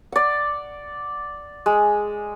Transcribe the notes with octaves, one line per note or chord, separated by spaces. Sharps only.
D5 F#5
G#3